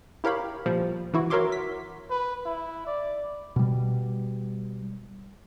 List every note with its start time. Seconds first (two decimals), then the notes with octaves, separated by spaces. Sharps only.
0.24 E4 G4 A#4 C#5 F5 B5
0.66 A#2 F3 G3
1.14 E3 E4 F#4
1.30 F#4 A#4 C#5 E5 C6 D6
1.52 B6
2.10 B4
2.45 E4
2.87 D5
3.56 B2 G3